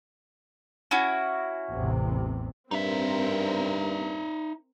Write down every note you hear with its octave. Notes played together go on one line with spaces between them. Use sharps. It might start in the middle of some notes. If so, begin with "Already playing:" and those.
C#4 E4 F#4
A1 E2 C3
G2 C4 D#4 A#4 E5